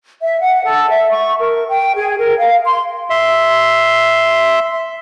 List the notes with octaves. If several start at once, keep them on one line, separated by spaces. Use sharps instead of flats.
E5
F#5
A4
E5
C#6
A#4
G5
G#4
A#4
F5
C6
E5 C6